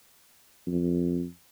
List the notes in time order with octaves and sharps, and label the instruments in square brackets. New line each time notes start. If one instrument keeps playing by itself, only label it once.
[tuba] F2